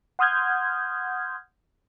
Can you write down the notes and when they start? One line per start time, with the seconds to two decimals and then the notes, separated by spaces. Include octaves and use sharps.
0.19 F#5 C6 D#6 F6 G6 G#6